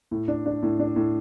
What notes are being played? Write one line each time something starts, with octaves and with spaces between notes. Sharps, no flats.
A2
D4
D4
A2
D4
A2